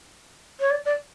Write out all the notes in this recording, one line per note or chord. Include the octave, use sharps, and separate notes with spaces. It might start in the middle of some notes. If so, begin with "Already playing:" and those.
C#5
D5
D5